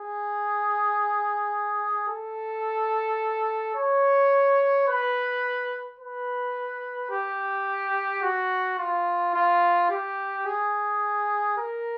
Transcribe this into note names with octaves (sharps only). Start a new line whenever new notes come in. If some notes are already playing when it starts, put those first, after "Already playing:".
Already playing: G#4
A4
C#5
B4
B4
G4
F#4
F4
F4
G4
G#4
A#4